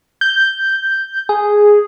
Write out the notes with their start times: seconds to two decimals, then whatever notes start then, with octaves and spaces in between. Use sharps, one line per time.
0.21 G6
1.29 G#4